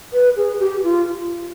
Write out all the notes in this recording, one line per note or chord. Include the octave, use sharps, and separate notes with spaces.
B4
G#4
G4
F4